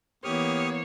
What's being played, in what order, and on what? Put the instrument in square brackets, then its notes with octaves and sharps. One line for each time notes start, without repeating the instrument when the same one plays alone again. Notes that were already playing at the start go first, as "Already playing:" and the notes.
[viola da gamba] E3 A#3 [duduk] B3 [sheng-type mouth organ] G4 D#6 F6 [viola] C#5